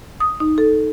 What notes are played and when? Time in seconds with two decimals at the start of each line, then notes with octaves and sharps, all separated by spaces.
0.20 D#6
0.40 D#4
0.58 A4